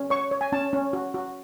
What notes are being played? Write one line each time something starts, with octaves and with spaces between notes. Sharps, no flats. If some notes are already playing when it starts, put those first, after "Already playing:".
Already playing: C#4
C#5 C#6
C#5
G#5
C#4 A5
C#4
F#4
F#4